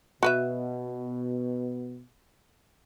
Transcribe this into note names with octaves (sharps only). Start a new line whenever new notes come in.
B2 F#4 B4 E5